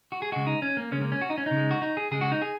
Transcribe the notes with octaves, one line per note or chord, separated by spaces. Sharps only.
F#4
G#4
C#3 G#3 F#4
D#4
C#4
A#3
C#3 G#3 C#4
A#3
C#4
F#4
D#4
C#4
C#3 D#4
G#3
F#4
D#4
G#4
C#3 G#3 G#4
F#4
D#4
G#4